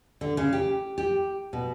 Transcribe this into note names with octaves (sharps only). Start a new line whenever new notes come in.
D3
C#3
G4
G4
B2